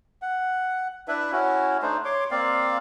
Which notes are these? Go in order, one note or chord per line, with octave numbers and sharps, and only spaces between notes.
F#5
D4 E4 B4 E5
C#4 E4 F#4
A3 D4 D#4 C5
C#5 C6 D6
A#3 C4 D5 F5